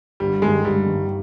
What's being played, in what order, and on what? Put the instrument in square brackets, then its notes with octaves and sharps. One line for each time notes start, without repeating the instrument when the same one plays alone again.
[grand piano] G1 [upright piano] G3
[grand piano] G2 D#3 [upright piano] G#3
[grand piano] G1 [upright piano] G3
[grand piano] G2 D#3